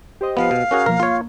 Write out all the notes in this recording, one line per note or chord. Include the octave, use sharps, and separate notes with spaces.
G4 C5 D#5
F3 B3 F5
B2
C#4 F#4 G#4 A#4 C#5
B2 F3 A#3 A#4
A#3 F4 C#5